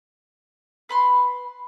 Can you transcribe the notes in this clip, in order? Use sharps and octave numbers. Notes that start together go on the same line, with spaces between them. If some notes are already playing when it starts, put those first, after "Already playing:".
B4 B5 C6